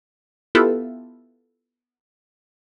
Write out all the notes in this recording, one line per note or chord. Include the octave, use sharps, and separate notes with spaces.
B3 E4 F4 G4 A4 E5